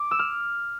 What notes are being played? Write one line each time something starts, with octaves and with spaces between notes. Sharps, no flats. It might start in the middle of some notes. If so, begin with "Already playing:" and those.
Already playing: D6
E6
F6